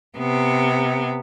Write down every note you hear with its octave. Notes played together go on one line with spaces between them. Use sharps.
C3 B3